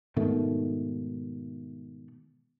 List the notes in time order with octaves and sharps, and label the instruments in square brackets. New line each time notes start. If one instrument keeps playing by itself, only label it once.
[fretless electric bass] G#2 B2 D#3 A3